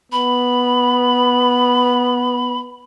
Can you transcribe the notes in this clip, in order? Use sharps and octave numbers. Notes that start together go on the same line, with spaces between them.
B3 B5